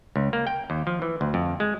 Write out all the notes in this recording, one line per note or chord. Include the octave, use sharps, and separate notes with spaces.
C#2
A#3
G5
D#2
F3
E3
D2
F2
G#3